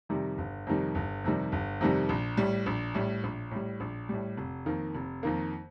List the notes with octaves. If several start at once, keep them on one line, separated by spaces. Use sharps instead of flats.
F2 C3 D#3 G3
G1
F2 C3 D#3 G3
G1
F2 C3 D#3 G3
G1
F2 C3 D#3 G3
A#1
A2 G3
A#1
A2 G3
A#1
A2 G3
A#1
A2 G3
F1
F2 D#3 A#3
F1
F2 D#3 A#3